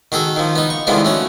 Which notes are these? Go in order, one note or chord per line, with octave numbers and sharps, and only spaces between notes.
D#3 F#4 G#4 A4
D#3 F3
B3 D#4
C#6
C2 D3 D#3 F3 G#3 B3
A3 C#4 F#4